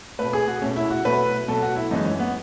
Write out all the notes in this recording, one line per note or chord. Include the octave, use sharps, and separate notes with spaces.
B2 A3 B4
G#4
F#4
B2 A3 C#4
E4
F#4
B2 F#3 A3 B4
B2 F#3 A3 A4
F#4
E4
F#2 E3 G#3 D#4
C#4
B3